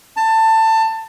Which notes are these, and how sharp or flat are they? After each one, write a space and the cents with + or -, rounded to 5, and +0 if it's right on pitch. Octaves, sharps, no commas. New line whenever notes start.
A5 +20